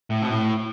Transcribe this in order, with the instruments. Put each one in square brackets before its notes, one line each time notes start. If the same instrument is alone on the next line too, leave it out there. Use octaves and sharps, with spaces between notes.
[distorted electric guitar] A2
B2
A2